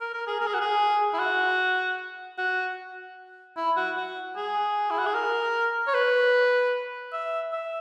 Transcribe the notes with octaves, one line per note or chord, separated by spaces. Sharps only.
A#4
A#4
G#4
A#4
G#4
F#4
G#4
E4
F#4
F#4
E4
F#4
F#4
G#4
E4
F#4
G#4
A#4
C#5
B4
E5
E5